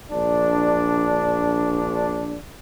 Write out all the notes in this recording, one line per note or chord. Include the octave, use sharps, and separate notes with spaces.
A#1 D4